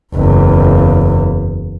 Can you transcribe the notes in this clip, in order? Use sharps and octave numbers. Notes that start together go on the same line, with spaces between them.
F#1 E2